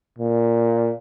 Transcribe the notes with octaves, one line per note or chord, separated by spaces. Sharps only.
A#2